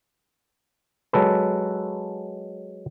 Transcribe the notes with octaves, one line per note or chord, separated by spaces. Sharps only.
F#3 G#3 A4 B4